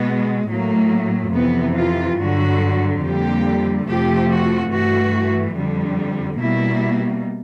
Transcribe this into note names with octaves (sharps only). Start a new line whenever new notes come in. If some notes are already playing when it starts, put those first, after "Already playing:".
Already playing: B2 G#3 B3
A2 F#3 A3 A#3
F2 C3 E3 B3
F4
G2 D3 F#3 F#4
F2 D3 G3 A#3 G4
F2 C3 F3 A3 G4
F#4
G2 E3 A3 F#4
F2 D3 G3
B2 G3 A#3 E4